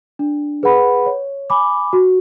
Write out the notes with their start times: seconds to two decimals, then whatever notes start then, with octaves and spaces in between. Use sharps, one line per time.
0.19 D4
0.63 G#4 B4 F#5 B5
1.06 C#5
1.50 G#5 B5 D6
1.93 F#4